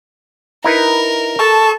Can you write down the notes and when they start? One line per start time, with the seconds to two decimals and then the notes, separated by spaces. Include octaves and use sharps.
0.64 D#4 E4 A#4 B4
1.39 A4 A5 C#6